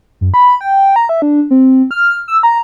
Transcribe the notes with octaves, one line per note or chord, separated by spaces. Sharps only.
F#2
B5
G5
A#5
E5
D4
C4
F6
E6
A#5